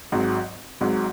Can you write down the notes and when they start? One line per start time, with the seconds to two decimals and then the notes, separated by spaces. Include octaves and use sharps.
0.12 G#1 G#2 F#3
0.81 G#1 G#2 F#3